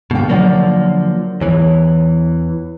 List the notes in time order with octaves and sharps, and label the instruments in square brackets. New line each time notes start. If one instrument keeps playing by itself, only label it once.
[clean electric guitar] B2 [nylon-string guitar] D3 A#3 G5
[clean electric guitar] D3 F3 A#3 [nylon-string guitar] F#3 D5 F#5
[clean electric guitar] E2 E3 [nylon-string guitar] C#5